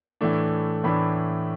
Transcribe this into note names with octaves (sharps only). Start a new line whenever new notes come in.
A2 E3 A3 D4
A2 E3 A3 D4 B5